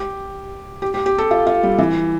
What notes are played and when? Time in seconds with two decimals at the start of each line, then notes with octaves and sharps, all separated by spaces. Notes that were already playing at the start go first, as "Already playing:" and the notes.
Already playing: G4
0.82 G4
0.94 G4
1.06 G4
1.18 A4
1.31 F4
1.47 F4
1.63 G3
1.78 E3